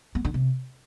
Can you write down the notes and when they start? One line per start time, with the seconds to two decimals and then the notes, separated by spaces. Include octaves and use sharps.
0.15 B3
0.25 D3
0.34 C3